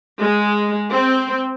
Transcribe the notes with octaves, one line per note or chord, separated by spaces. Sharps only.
G#3
C4